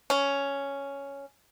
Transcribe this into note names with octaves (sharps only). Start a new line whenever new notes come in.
C#4